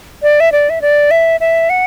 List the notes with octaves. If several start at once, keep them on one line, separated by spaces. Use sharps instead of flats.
D5
E5
D5
E5
D5
E5
E5
F#5